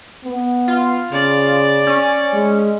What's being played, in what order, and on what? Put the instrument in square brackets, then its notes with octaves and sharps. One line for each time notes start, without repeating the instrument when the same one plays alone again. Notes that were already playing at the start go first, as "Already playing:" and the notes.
[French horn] B3
[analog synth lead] F4
[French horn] C#3 [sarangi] D5
[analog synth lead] C#4
[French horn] G#3